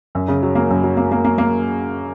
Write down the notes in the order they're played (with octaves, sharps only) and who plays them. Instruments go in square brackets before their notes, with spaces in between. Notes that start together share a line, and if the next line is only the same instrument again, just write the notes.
[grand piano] F#2
C#3
F#3
A#3
F#2
F#3
A#3
A#3
A#3
A#3